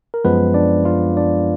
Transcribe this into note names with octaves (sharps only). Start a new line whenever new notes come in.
A#4
F#2 F3 G#3 B3 B4
D4 D5
F4 F5
D4 D5